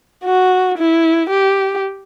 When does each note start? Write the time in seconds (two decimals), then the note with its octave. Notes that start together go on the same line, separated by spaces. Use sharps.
0.24 F#4
0.77 E4
1.30 G4